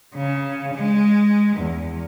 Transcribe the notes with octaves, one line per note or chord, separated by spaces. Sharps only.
C#3
G#3
E2